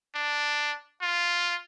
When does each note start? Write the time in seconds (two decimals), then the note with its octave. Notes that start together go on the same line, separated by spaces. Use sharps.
0.15 D4
1.02 F4